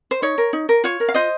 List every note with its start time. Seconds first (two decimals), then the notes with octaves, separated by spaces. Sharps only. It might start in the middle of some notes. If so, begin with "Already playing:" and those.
0.11 C5
0.22 D#4 C#5
0.38 A#4
0.53 D#4
0.69 A#4
0.84 F4 C#5
1.00 A#4
1.08 F5
1.14 F4 C5 D#5